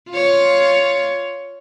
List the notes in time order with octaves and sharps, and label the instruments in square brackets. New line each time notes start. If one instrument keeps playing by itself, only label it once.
[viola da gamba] F4 C#5